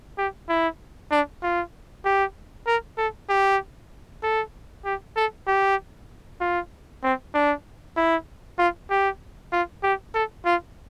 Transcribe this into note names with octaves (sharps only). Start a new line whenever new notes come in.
G4
E4
D4
F4
G4
A#4
A4
G4
A4
G4
A4
G4
F4
C4
D4
E4
F4
G4
F4
G4
A4
F4